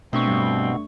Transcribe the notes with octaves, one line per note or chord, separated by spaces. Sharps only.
B2 A3 C4 D4 C#6
G2